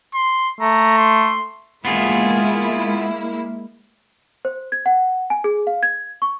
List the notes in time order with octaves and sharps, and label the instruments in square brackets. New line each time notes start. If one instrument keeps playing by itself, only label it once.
[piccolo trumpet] C6
[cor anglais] A3 [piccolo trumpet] A#5
[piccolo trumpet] C6
[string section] G#3 A#3 E4 [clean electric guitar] B3 F4 G#4
[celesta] C5
G#6
F#5
G#5
G#4
F5
G#6
C#6